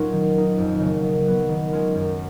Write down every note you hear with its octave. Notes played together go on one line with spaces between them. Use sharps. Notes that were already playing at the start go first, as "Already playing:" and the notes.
Already playing: A#2 F#3 C#4 D#4 F4
D#3
A#3 D#4
F2
C#3 F#3 A#3
D#3
F#3 B3
D#3
G#3 C#4 F4
F#2